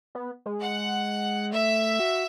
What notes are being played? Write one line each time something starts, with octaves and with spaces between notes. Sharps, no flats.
B3
G#3
F#5
A3 E5
F#4